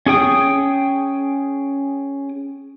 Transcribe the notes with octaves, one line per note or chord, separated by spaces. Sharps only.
C#4 G#4 G5 D#6